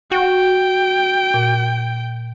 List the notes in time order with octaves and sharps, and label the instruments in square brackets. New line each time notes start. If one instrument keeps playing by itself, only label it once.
[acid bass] F#4 [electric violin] G5
[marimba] A#2